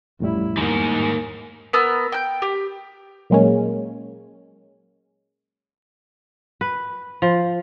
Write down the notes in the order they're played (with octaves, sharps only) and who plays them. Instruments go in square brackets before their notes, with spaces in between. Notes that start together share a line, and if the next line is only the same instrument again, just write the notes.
[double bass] A1 E4 [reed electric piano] F2 A2 G3
[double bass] E2 [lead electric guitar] G#2 [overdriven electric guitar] D#3 A#3
[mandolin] B3 A#4 E6
G5 G6
G4
[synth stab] A#2 F#3 G#3 A#3 C#4
[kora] B4
F3